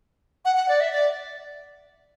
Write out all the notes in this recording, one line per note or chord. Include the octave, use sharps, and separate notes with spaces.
F#5
F#5
D5
E5
D5